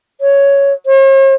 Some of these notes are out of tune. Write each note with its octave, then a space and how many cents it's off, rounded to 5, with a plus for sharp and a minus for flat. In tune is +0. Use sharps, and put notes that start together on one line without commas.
C#5 +5
C#5 -45